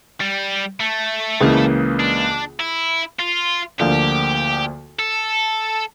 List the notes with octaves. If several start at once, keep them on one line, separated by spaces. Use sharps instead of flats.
G3
A3
C#2 C#3 E3 A#3
D4
E4
F4
D2 D3 F3 A#3 G4
A4